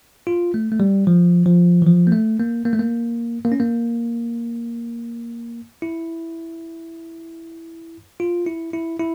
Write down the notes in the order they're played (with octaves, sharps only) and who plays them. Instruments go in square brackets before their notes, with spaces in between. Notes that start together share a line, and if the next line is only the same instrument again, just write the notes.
[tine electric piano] F4
A3
A3
G3
F3
F3
E3
F3
A#3
A3
A#3
A#3
A3
A#3
A#3
C#4
A#3
E4
F4
E4
E4
E4